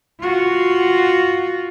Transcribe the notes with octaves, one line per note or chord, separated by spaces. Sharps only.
F4 F#4